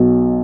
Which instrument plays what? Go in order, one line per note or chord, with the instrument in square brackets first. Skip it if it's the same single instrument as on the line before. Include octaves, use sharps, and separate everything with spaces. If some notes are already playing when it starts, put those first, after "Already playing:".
Already playing: [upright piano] B1 B2 F#3